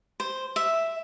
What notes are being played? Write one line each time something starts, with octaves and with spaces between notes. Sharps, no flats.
C5
E5